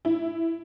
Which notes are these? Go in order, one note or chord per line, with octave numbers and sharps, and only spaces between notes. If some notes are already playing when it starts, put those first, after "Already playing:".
E4